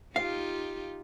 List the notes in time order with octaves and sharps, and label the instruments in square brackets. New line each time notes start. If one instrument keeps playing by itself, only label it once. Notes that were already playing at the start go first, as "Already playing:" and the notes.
[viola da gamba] D#4 F4 G4 [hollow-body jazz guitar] F5